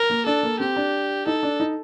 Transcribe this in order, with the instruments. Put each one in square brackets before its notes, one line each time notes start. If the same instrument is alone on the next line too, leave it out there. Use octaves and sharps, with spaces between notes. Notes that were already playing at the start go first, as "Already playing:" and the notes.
Already playing: [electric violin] A#4
[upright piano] A#3
[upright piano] D4 [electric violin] A4
[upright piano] A#3
[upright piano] C4 [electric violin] G4
[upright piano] D4
[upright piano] D#4 [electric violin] A4
[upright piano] D4
D#4